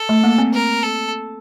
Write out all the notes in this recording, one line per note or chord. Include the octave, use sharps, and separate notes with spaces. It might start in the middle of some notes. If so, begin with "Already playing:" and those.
Already playing: A4
A3
A#3
C4
A#4
A4